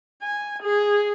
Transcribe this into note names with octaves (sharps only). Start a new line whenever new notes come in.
G#5
G#4